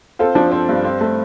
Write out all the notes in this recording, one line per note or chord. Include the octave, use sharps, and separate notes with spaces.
C4 F4 A4
F3 D4
C4
G2
C4
A3